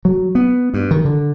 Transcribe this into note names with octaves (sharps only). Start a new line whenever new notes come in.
F#3
B3
G2
D#3
D3